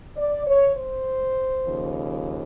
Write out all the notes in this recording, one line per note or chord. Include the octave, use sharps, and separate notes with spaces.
D5
C#5
C5
D#2 C#3 F3